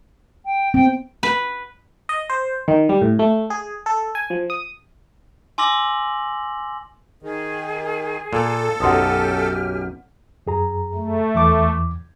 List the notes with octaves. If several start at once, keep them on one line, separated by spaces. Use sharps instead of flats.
G5
B3 C4 G5
B4
D#5
C5
D#3
G3
A2
A3
G#4
A4
G#5
F3
D#6
G#5 C6 D6 E6 A#6 F#7
D#3 G#4
A#2 A4
B1 F#2 G4 F#5 G#5 C6 D#6 F6
F#2 G#4 A#5
A3
E2 E3 D6